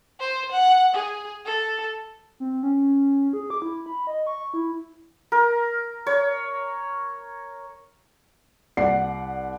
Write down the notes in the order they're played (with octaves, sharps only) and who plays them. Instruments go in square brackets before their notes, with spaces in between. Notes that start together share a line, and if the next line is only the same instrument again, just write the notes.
[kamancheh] C5
F#5
G#4
A4
[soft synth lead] C4
C#4
G#4
D6
E4
B5
D#5
C#6
E4
[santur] A#4
C#5
[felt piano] C2 D5 F#5 C7